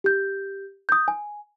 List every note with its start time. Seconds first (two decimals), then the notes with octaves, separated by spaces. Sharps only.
0.04 G4 G6
0.89 D#6 G6
1.08 G#5